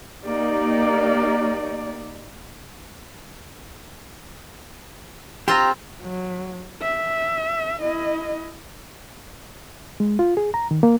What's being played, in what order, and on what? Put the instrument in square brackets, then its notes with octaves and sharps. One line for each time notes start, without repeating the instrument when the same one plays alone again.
[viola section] A#3 D#4 G4 D5
[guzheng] C4 F4 C6 [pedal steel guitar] G4 A#5
[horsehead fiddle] F#3
E5
E4 D#5
[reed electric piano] G#3
F4
G#4
A#5
D#3
A#3